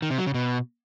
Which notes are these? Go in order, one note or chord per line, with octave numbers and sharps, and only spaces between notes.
D#3
C3
F#3
C#3
B2